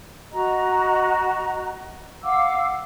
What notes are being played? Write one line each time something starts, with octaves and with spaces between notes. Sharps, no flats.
F#4 D#5 A#5
F5 F#5 D6 E6